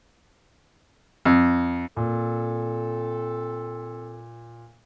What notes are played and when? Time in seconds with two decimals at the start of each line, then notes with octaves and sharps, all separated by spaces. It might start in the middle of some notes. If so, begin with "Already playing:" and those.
1.25 F2
1.97 A#2 C4 A4